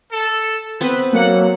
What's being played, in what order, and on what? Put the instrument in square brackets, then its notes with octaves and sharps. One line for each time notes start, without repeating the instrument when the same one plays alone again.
[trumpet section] A4
[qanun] B3 C4 [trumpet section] B4
[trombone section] F#3 [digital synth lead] A#3 [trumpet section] A4 F#5